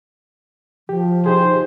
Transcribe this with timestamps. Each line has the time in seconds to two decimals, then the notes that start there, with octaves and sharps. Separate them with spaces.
0.89 F3 G4
1.26 D#4 G4 G#4 C5